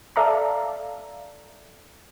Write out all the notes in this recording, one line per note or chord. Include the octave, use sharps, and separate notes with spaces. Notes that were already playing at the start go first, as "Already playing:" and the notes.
A4 D5 E5 F5 A5 A#5